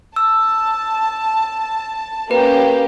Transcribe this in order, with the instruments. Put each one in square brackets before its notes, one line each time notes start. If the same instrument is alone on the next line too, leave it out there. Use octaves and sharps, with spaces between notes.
[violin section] A5 [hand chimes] E6
[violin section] A#3 C#4 G4 [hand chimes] B4